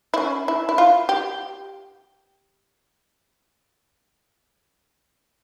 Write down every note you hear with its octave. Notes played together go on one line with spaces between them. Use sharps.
E4
C#4
E4
E4
F4
G4